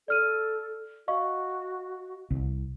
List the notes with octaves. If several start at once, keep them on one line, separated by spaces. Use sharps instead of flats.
A4 D5 F6 D#7
F#4 D#5 F5 C#6
C2